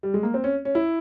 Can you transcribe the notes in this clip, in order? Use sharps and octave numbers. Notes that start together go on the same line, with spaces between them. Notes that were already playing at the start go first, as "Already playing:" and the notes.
G3
G#3
A#3
C4
C#4
C#4
E4